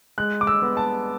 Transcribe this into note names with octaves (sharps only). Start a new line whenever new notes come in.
G#3 F#6
D6
E6
B3
A5